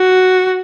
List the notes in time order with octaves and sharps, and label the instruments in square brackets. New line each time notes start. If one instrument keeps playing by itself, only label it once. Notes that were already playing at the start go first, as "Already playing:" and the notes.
Already playing: [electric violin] F#4